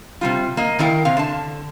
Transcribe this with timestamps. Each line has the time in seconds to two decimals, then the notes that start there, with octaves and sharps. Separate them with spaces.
0.21 C3 G3 F4
0.57 A#3 D#5
0.79 D#3 E4 A#4 C#5 F5 G5
1.05 C3 F5
1.17 D3 A5